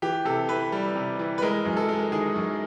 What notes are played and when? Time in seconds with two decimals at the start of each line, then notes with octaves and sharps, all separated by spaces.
0.02 E3 G4
0.25 C3 A4
0.49 E3 B4
0.72 G3
0.96 C3
1.19 E3
1.38 B4
1.42 G#3 A#4
1.65 F#2
1.77 A4
1.89 G#3
2.12 D#3 G#4
2.35 F#2